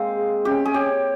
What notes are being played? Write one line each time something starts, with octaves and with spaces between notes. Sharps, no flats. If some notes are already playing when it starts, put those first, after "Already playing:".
Already playing: G#3 A#3 C4 F5
G#4
C#4 G4
G#4
G4 C#5